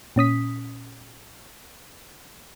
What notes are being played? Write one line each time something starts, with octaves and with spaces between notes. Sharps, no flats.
A#2 C#4 D#6 B6